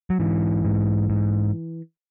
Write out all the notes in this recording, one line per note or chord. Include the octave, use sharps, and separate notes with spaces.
F#3
G#2 E3
G#2
G#2